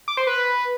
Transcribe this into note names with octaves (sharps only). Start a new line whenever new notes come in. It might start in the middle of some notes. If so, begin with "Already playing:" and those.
D6
C5
B4